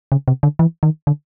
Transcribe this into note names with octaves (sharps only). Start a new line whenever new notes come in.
C#3
C3
D3
E3
D#3
D3